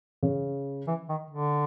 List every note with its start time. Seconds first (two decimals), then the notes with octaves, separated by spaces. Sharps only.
0.23 C#3
0.87 E3
1.09 D#3
1.30 D3